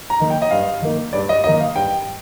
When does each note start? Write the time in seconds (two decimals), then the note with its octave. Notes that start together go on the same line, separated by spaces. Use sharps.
0.10 A#5
0.20 D#3 A#3 D#4
0.30 G5
0.42 D#5
0.51 G2 F5
0.82 D#3 A#3 D#4
1.13 G2 D5
1.29 D#5
1.44 D#3 A#3 D#4 D#5
1.60 F5
1.76 G2 G5